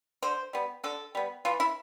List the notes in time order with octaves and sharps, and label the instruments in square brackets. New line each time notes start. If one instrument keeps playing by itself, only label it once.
[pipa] D3 C5
G3 B3
D3 A4
G3 B3
E3 F4
E4